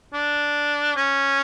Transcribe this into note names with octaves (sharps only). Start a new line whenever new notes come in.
D4
C#4